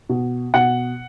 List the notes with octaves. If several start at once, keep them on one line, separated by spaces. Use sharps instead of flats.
B2
B2 F#5